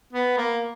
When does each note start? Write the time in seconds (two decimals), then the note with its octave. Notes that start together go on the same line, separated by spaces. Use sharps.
0.13 B3
0.37 A#3